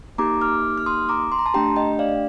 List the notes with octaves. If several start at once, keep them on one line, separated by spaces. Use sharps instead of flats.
A#3 D#4 G4 A#5 D6
D6 F6
F6
C6 D#6
A#5 D6
C6
A#5
A5 C6
A3 D4 G4 G5 A#5
D#5 G5
D5 F5